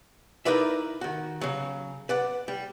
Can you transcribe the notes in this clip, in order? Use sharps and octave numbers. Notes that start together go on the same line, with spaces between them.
D#4 E4 A#4 B4 D5 E5
D#3 F#4
C#3 F#3
B4 D5 F#5
G3